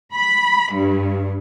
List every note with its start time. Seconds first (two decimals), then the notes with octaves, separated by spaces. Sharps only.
0.13 B5
0.72 G2